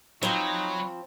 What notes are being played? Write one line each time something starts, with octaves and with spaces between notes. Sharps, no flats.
F3 F#3 C4 D#4 B5 C#6